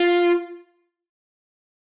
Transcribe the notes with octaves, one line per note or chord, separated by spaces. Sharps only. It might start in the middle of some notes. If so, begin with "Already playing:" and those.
Already playing: F4